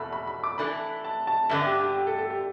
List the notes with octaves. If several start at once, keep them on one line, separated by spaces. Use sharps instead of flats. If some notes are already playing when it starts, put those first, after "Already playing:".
Already playing: E2 B2 A3 B5
B5
B5
D6
E3 A3 D4 A4 B5
A5
A5
G2 D3 B3 D4 E5
G4
G4
G4
A4
A4
G4